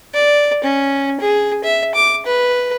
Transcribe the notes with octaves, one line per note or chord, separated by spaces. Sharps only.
D5
C#4
G#4
E5
D6
B4